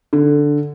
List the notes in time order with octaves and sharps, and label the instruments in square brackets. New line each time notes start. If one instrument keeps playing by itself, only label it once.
[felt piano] D3